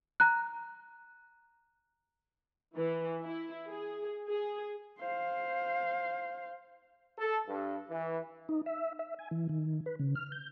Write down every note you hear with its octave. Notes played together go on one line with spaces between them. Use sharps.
A#5 F#6
E3
E4
G#4
G#4
C5 F5
A4
G2
E3
D#4
E5
E5
G#5
E3
D#3
B4
C#3
F6
G6